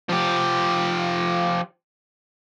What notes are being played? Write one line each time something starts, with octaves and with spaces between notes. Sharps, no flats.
F3 G4